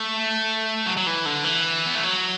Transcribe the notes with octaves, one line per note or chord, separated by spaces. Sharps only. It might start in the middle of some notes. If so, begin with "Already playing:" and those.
Already playing: A3
F#3
F#3
E3
D3
E3
B3
A3
F#3